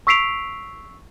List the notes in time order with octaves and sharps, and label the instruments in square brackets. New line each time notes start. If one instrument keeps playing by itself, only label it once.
[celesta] C#6 E6 B6 C7 D7 F7